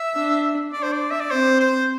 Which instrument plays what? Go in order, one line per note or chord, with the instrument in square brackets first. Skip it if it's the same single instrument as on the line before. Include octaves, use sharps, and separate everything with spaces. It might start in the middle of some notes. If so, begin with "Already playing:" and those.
Already playing: [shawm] E5
[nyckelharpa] D4
[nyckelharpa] D4 [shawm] D5
[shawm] C5
D5
E5
D5
[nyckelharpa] C4 [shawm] C5
[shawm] C5